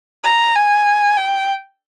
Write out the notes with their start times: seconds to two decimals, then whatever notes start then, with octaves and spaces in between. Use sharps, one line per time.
0.24 A#5
0.55 G#5
1.17 G5